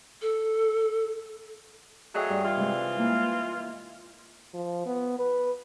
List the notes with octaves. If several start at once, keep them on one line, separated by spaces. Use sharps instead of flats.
A4
F#3 A3 G#4 D#5 G5 D#6
G2
E3 F4
C3 G#3
A#3 E4
F3
B3
B4